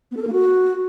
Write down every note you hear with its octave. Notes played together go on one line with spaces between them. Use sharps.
B3
A4
A#4
A#3
F#4